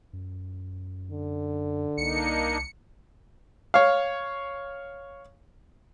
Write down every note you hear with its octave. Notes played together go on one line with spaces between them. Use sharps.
F#2
D3
C2 A#3 D4 D#4 C#7
C#5 F5